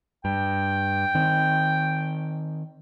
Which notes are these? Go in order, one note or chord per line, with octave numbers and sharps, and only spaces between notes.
G2 G5
D#3 C4